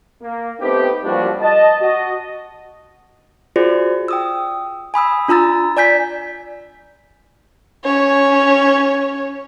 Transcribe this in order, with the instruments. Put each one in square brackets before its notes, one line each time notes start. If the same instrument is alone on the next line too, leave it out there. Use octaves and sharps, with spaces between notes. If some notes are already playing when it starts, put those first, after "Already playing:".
[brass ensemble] A#3
A3 B3 C4 D#4 G4
F#2 F3 G3 A#3 D4 F#4
D#5 A5
F#4 D#5
[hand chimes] F4 F#4 G#4 C5 D5
G5 D#6 E6
G#5 B5 D#6 E6
D4 F4 A#5 E6 A6
D5 G#5 G6 B6
[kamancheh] C#4 C#5